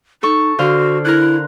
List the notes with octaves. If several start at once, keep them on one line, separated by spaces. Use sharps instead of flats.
D#4 A4 C#6
D3 F#4 C5 F5
E4 A#4 F#6